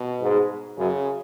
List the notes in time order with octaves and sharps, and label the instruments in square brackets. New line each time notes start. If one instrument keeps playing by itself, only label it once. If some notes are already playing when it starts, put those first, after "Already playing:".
Already playing: [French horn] B2
[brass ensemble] G#2
[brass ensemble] F#2 [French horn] C#3